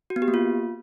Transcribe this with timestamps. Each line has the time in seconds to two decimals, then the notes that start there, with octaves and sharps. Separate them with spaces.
0.10 F#4
0.16 B3
0.22 G4
0.28 A#3
0.34 F4